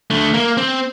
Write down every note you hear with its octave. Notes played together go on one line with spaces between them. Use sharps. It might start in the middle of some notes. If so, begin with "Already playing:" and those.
D3 A3
A#3
C4